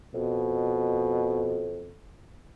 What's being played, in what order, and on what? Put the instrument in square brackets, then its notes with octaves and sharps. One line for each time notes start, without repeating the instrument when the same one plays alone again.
[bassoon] F2 [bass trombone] B2